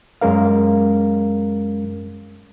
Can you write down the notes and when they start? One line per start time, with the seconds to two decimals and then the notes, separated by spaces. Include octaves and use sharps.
0.21 F#2 G#3 C#4 A#4 F5